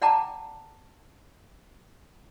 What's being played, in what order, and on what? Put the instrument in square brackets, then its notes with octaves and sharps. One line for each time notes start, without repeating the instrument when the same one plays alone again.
[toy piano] D5 F#5 G5 A5 A#5 D6